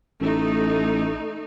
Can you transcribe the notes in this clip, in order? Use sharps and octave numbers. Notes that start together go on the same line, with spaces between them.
A1 A3 D#4